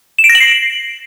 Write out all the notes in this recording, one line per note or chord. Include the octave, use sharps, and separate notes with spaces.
E7
D7
A#6
F#7
C7